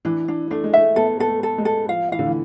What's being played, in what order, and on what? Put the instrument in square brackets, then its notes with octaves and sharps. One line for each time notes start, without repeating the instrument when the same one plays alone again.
[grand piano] E3 [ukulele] D4
[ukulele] D4
[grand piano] A3 [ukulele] D4
[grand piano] G#3
[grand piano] A3 [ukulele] E5
[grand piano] B3 [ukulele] A4
[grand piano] B3 [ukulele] A4
[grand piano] A3
[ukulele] A4
[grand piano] G#3
[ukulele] A4
[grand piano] F3 [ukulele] F5
[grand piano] E3 [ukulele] F5
[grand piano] D3
E3